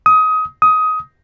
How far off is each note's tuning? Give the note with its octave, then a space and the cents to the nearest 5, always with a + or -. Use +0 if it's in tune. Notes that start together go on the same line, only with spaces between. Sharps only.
D#6 +25
D#6 +20